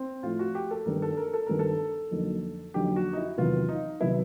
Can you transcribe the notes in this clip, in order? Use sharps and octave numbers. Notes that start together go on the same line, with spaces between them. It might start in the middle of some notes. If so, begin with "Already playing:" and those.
Already playing: C4
A2 F3 A3 F4
F#4
G4
A4
G2 D#3 G3 B3 A#4
A4
A#4
A4
G2 D#3 G3 B3 A#4
A4
F2 D3 F#3 A#3 D#4
F2 D3 F#3 A#3 D#4 G4
F#4
D#4
E4
E2 C3 D#3 F#3 B3 F4
D#4
C3 D#3 F#3 B3 E4